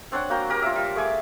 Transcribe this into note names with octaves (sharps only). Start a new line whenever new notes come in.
C4 D4 C#5 F#5
A#3 F#4 G5 A#5
G4 A#4 G#5
F4 E5
G3
A3 G#4 G#5 D6